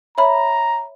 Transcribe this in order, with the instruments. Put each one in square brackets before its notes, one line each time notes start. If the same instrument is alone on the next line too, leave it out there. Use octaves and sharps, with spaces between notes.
[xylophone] C#5 E5 B5 [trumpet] A#5